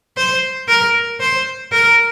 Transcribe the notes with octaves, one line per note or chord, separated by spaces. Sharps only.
C5
A#4
C5
A#4